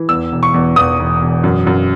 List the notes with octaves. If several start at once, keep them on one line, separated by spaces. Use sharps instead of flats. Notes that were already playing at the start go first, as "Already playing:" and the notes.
Already playing: E3
E2 E6
E1
C#6
E2
E2 D#6
E1
E1
F#2
F#2